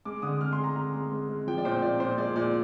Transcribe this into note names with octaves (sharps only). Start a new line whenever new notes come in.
G#3 D6
D3 D#6
G#3 F6
C6
G#3
A#5
G#3 A#5
G#3
G#3
G#3
F3 G5
D5
A#2 C5
A#2 D5
A#2 C5
G#3 D5
A#2 D5